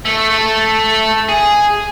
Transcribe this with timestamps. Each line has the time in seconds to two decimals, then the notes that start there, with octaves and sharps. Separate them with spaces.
0.05 A3
0.32 A3
1.29 G#4